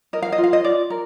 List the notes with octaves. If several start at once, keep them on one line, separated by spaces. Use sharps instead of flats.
A#4 D#5
F5
D#5
F4
F5
D#5
F4 D5
A#4